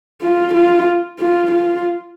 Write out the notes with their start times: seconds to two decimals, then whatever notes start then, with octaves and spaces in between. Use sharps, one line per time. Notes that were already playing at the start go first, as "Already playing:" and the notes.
0.22 F4
0.54 F4
1.20 F4
1.51 F4